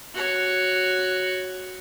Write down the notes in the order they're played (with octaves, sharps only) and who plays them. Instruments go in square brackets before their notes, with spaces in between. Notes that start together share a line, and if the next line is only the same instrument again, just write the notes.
[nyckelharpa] F#4 C#5